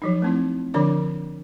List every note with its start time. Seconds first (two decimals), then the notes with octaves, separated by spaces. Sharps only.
0.02 F3 F#3 D#4
0.22 A3 C4 E4
0.74 D3 F3 D4 D5 D6